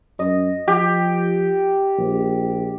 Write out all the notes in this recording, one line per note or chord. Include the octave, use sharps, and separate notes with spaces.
F#2 D#5
F3 G4
A#1